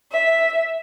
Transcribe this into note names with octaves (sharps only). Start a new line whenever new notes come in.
E5